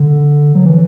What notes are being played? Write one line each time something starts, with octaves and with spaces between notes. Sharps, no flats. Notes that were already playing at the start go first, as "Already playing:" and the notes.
Already playing: D3
F#3
E3